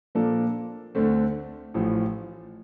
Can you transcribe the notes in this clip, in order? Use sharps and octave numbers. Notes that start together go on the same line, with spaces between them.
A#2 F3 A#3 D4 A4
D2 D3 A3 C4
A1 A2 F3